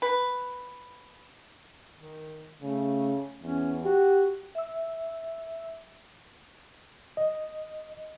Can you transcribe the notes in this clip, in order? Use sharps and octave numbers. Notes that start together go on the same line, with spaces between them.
B4
D#3
C#3 A3
E2 C#4
F#4 G4
E5 E6
D#5